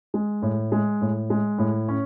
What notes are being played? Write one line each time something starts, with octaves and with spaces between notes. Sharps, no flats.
G#3
A2
G#3
A2
G#3
A2
C#4